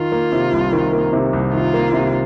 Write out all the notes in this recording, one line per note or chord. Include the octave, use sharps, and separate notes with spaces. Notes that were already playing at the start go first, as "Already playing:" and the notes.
Already playing: D#3 F4
A#3
C3
C2
D#3
A#3
C3
C2
D#3 F4
A#3
C3